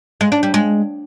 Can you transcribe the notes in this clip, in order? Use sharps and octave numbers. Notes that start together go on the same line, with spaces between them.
G#3
D4
G3
G#3